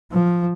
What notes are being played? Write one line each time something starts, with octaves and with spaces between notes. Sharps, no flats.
F3